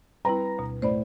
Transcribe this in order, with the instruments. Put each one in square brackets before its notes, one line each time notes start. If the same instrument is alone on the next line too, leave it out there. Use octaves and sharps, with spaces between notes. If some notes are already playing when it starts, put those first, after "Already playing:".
[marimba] G3 C4 E4 [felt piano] B4 A#5
[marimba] D2 B2
[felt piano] A2 [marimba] C5 D5 B5